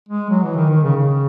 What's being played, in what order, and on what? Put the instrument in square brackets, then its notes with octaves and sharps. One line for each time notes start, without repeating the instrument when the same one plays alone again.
[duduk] G#3
F#3
E3
D#3
D#3
C#3
C#3